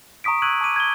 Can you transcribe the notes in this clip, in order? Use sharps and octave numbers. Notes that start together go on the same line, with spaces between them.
A#5 C#6 D#6 B6 D7
C#6 E6 F#6 G#6 D#7 F#7
A5 D6 D#7
G#6 G7